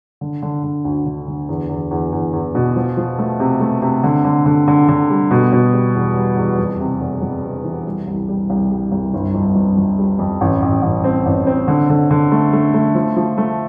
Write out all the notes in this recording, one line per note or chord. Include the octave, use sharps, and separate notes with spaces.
D3
D3
D3
D2
D3
D3
E2
E2
E2
E2
E2
B2
F3
F3
A3
C3
A3
C3
D3
D3
D3
D3
D3
G3
B2
B2
G3
E2
G3
E2
F2
C3
F1
F2
C3
E3
G3
C2
G3
C2
G3
C2
G1
F2
F2
F2
G3
F2
A1
A1
A1
C4
A1
C4
D3
D3
D3
A3
A3
A3
F3
F3
A3